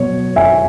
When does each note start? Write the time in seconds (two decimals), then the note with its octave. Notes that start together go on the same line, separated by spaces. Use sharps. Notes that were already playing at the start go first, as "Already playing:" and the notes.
Already playing: B2 F#3 C#5
0.36 E5 G#5